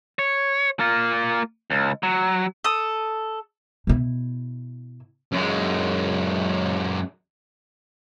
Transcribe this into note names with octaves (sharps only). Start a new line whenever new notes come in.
C#5
A#3 F4
C#2
F#3
A4 D#6
B2 E4
F#2 G#3